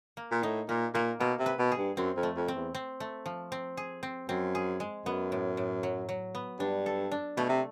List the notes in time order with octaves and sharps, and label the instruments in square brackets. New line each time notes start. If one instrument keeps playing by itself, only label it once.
[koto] A#3
[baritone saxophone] A#2
[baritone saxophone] A2 [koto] D#4
[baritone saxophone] A#2 [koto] A#3
[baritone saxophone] A#2 [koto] A#3
[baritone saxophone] B2 [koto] A#3
[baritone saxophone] C3
[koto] B4
[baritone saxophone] B2
[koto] G#4
[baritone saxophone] G2
[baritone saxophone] F#2 [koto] C4
[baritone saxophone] F2
[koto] A3
[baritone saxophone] F2
[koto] C4
[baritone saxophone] E2
[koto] C4
A3
F3
C4
G#4
C4
[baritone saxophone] F#2 [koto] C4
[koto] G#4
G#3
[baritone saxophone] F#2 [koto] B3
[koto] A2
A2
F#3
F#3
B3
[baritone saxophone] G2 [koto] D4
[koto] A4
D4
[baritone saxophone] B2 [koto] A3
[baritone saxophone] C3